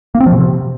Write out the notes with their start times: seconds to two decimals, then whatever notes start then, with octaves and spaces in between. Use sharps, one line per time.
0.15 A#3
0.20 C4
0.26 F3
0.32 B2
0.38 C3